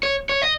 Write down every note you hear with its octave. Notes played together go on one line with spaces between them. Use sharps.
C#5
C#5
D#5